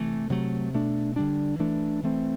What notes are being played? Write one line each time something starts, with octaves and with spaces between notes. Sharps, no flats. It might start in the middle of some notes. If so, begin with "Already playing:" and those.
Already playing: C3 E3 A3
C3 F#3 A3
B2 A3 D4
D3 G3 D4
E3 A3 D4
E3 A3 C4